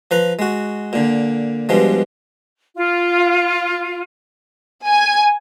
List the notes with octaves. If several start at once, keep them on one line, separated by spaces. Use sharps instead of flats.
F3 B4 A#5
G#3 F#4
A#2 D3
G2 B2 F3 G#3
F4
G#5